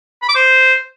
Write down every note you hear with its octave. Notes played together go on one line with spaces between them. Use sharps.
B5
D6
C5